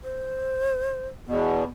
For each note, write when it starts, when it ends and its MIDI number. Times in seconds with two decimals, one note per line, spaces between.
0.04 1.07 72
1.27 1.64 40
1.27 1.64 47
1.27 1.68 59